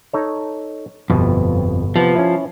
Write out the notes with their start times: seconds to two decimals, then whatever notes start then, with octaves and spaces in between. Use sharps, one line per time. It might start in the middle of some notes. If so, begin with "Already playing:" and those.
0.13 D#4 A4 C#5
1.10 G1 F2 B2
1.96 C3 F3 B3
2.15 C#4 E4